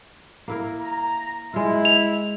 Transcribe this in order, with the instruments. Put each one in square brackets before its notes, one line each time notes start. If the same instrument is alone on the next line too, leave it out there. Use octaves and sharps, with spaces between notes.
[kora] A#3 E4 A#4
[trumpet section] A#5
[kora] G#3 F4 [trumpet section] E4
[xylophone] F7